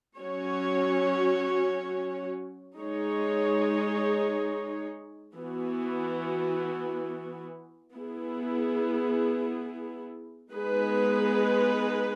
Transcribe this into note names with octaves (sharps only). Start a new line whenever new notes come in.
F#3 C#4 F#4 C#5
G#3 D#4 G#4 C#5
E3 B3 F#4
B3 E4 G#4
G#3 B3 D#4 G#4 B4